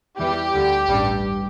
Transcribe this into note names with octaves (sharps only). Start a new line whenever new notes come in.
E2 E3 G3 G4
D2 D3 G3
A1 G2 G3